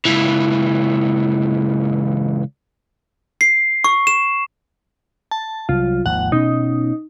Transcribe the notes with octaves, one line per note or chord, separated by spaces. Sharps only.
C#2 E3
C7
C#6
E7
A5
C2 F#3 F4
G#1 D#2 F3 F#5
B2 C#4 D#4